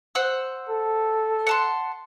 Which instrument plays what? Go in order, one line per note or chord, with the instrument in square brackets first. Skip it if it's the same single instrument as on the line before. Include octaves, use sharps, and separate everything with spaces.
[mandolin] C5 F#5 E6
[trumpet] A4
[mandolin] F#5 A5 C6